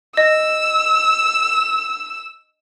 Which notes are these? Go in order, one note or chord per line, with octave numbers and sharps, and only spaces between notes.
D#5 E6